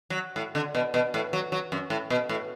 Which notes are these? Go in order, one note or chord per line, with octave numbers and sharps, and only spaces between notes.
F#3
A2
D3
B2
B2
A2
F#3
F#3
F#2
A2
B2
A2